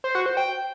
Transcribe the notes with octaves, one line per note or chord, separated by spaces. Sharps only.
C5
F#4
C5
G5